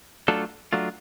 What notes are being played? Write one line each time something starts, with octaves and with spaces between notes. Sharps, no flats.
F#3 A3 D4 F4 A4
F#3 A3 D4 F4